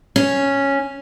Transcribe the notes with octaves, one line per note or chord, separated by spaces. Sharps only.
C#4